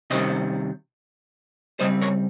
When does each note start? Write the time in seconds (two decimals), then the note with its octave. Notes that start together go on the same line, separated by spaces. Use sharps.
0.10 C3 D#3 G3 C#4 C5 D#5
1.80 C#3 G3 C4 C5 D#5
2.01 A#4 C#5